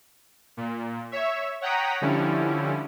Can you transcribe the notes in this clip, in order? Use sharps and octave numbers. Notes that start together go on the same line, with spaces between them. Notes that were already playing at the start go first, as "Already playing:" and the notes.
A#2
C#5 E5
C#5 F#5 G5 A#5 D#6 B6
D3 F3 G3 C#4 E4